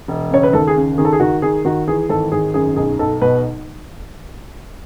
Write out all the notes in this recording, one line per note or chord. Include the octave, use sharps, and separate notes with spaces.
E1
C#3 C#5
B4
D#2 A4
G#4
C#3
D#3 G#4
A4
G#4
D#3 F#4
D#3 G#4
D#3 F#4
E3 G#4
G#1 A4
G#1 G#4
F#2 G#4
B1 G#4
B1 A4
B2 B4